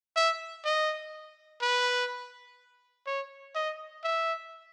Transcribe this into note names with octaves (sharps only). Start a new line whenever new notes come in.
E5
D#5
B4
C#5
D#5
E5